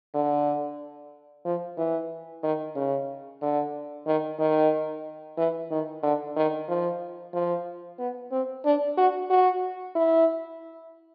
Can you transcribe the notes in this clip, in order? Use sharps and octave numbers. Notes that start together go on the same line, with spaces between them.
D3
F3
E3
D#3
C#3
D3
D#3
D#3
E3
D#3
D3
D#3
F3
F3
B3
C4
D4
F#4
F#4
E4